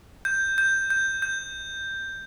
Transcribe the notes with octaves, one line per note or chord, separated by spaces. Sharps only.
G6
G6
G6
G6